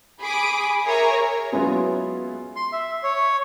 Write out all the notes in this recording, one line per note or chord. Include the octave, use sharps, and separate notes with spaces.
G#4 B5 D6 D#6
G#4 A#4 C#5 E5 A#5
F#3 G#3 B3 C#4 E4 F4
C6
E5
C#5